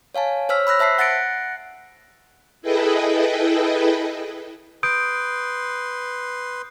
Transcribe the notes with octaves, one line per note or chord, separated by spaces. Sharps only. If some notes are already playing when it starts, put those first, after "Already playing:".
C#5 F5 G#5 A5
C5 C#5 E6 F6 B6
B5 E6 F#6 A#6
C5 E5 A5 B6 C7
F#5 F#6 A6 A#6 C#7 D7
E4 G#4 A4 B4 D#5 G5
B4 C6 D#6 G6 D7